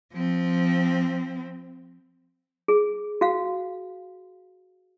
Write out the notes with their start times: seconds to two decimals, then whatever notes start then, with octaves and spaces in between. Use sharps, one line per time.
0.13 F3 C4
2.68 G#4
3.21 F#4 F5